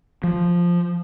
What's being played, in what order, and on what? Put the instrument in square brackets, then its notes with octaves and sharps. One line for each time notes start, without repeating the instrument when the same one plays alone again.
[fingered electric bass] F3